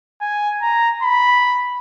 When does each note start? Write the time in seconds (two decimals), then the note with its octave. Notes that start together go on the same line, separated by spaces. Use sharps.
0.21 G#5
0.62 A#5
1.03 B5